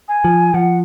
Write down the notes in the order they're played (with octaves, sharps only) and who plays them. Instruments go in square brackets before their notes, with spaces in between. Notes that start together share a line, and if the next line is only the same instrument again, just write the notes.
[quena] G#5
[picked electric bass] F3
[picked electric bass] F3 [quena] F#5